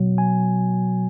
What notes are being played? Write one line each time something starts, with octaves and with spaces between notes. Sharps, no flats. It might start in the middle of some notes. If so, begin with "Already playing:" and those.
Already playing: B2 F#3
G#5